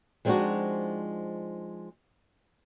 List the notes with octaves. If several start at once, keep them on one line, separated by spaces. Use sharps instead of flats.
F3 G#3 C4 D4 D#4 F#4